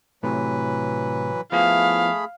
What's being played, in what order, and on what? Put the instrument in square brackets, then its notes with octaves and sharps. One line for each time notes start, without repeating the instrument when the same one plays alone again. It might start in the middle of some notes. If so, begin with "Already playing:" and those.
[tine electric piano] A2 C3 [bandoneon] E3 F#3 B4
[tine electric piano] F3 B3 E4 [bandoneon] A3 G#4 B5 [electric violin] F5